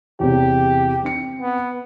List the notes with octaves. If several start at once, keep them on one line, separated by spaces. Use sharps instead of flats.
E2 C3 G4
C4 G5 C#7
B3